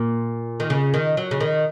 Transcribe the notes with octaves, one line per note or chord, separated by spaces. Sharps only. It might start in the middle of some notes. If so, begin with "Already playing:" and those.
Already playing: A#2
D#3
C#3
D#3
F#3
C#3
D#3